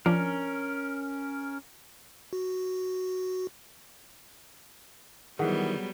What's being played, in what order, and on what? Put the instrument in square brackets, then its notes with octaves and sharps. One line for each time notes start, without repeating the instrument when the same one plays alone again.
[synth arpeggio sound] F3 D4 [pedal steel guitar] C#4 A#4
[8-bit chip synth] F#4
[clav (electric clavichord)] D#3 E3 [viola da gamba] F#3 G3 B3 [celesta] G#4 F#5